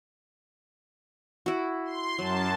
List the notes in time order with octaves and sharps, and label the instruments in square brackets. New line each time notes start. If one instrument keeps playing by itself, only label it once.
[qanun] E4 F#4
[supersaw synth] C6
[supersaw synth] F#2 A5 [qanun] F#3